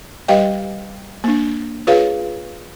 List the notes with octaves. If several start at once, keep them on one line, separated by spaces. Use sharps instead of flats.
G3 G4 B4 D#5 F5 G5
A#3 D4
F4 G#4 B4 C#5 F5